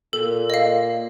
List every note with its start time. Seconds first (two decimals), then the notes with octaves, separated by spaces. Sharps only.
0.13 A#2 A4
0.50 D#5 F5